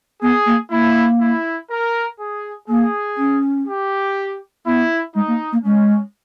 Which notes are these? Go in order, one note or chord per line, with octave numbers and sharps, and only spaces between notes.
B3 G#4
A#3
A#3 E4
E4
A#4
G#4
A#3 G#4
C#4
G4
B3 E4
G#3 D#4
A#3
A#3
G#3 C#4